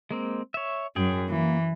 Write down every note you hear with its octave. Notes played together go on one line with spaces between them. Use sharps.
G#3 A#3 C4
C#5 E5
F#2 G#4 G5
E3 A#3